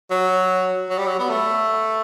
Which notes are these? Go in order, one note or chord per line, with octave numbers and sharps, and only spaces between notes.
F#3
F#3
G3
F#3
B3
A3